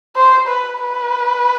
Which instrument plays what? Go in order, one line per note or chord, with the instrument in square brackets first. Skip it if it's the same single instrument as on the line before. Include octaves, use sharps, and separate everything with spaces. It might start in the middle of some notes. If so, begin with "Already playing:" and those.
[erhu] C5
B4
B4